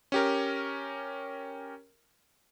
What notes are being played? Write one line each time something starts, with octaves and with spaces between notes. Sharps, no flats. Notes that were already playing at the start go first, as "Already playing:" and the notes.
C#4 G4 A#4